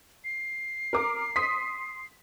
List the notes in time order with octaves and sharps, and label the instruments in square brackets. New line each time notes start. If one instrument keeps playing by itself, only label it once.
[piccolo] C7
[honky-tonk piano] A#4 D6
C6 D#6 B6